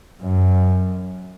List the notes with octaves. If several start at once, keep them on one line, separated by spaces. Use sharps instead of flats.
F#2